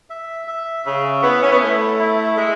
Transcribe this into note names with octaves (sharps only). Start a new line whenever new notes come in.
E5
E5
C#3 E5
B3 E4
C#4
B3
A3 E4
E4
G#3 E5